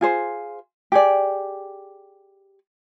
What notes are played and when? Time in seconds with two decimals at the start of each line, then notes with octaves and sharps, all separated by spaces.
0.01 F4 G#4 C5
0.92 G4 G#4 D5